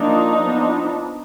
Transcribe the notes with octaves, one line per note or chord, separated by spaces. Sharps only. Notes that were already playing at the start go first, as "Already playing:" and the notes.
Already playing: F3 A#3 D4 D#4
F3 B3 D4